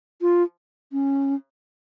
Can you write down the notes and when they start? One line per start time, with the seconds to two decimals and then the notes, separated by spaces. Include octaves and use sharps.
0.22 F4
0.92 C#4